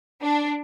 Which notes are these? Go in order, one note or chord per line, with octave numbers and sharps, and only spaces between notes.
D4